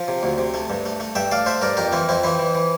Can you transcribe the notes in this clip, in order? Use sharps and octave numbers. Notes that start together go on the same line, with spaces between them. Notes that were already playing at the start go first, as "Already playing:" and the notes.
Already playing: F3
C3
D2
C3
A3
G2
A3
A3
G2 E5 G5
A3 D5 F5
A3 C5 E5
G2 A#4 D5
F2 G4 A#4
E3 C4 E4
F2 C4 E4
E3 C4 E4
E3
E3